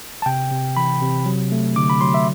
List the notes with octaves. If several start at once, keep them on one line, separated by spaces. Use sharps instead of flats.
A5
C3 G5
C3
E3 B5
C3
F#3
A3
D3 D6
B5
F#3 C6
E5